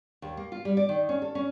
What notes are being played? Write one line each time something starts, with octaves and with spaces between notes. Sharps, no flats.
D#2
A#3
F4
G3
D5
D#3
C#4
A4
C#4